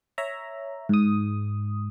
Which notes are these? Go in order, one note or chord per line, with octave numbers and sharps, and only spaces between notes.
C#5 E5 A#5
G#2 D#6